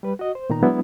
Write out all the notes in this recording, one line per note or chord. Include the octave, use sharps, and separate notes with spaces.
G3 B4
F#4 D#5
C5
A#2 D#3 B3 D#4 A#5
F#3 G#3 B3 D4 E4